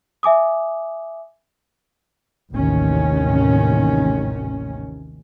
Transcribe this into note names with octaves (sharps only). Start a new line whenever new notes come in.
E5 G#5 D6 D#6
A1 D#2 C3 D#3 C#4